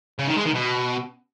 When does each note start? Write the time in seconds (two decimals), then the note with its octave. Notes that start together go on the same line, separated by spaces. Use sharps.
0.19 C#3
0.27 D#3
0.36 G#3
0.45 D#3
0.54 B2